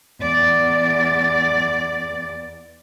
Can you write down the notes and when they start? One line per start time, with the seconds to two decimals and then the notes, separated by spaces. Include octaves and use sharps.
0.21 E2 D5